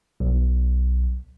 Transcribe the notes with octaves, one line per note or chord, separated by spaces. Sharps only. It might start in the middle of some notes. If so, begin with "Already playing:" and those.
B1